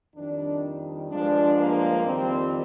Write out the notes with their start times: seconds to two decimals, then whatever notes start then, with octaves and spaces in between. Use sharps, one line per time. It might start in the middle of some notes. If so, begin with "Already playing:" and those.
0.15 F2 D#3 G3 D4
1.10 G2 F3 G#3 D4
1.58 A#3
2.05 F2 D#3 G3 C4